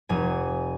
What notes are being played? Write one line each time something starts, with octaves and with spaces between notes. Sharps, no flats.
F1 G#5